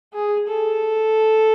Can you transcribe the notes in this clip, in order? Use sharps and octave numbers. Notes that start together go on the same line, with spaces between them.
G#4
A4